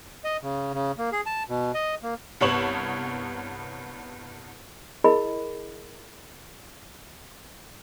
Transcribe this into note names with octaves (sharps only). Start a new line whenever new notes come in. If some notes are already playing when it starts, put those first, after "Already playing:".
D#5
C#3
C#3
A#3
G#4
A5
B2
D#5
A#3
C2 G2 B3 C#5 E7 F#7
E4 G#4 A#4 D#5 B5